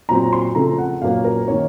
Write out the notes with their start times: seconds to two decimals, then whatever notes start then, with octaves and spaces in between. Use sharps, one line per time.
0.09 A#2 F#3 C4 A#5
0.33 C6
0.55 C#3 F3 A3 C4 A#5
0.78 F#5
1.02 A#2 F#3 A#3 C#4 F5
1.24 A#4
1.47 D#3 A#3 C#4 C#5